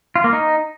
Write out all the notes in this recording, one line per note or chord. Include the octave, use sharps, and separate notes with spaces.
F4
A#3
D#4